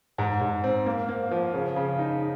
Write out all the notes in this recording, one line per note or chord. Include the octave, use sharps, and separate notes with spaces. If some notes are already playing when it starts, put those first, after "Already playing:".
G#2
G#2
C4
A#3
A#3
F3
C#3
C#3
D#4